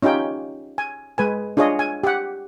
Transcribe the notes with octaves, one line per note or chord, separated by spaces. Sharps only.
C#4 D#4 F4 G4 G5
G#5
G#3 B4 G#5
D4 F4 G#4 C#5 D#5
G#5
G4 F#5